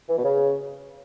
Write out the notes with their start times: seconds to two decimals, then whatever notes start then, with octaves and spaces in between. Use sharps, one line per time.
0.08 E3
0.17 B2
0.24 C#3